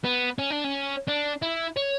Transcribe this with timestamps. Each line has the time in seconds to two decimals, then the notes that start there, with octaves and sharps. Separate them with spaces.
0.04 B3
0.39 C#4
0.51 D4
0.64 C#4
1.08 D4
1.42 E4
1.77 C#5